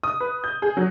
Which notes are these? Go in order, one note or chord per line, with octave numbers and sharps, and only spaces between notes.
D#6
B4
G6
G#4
F#3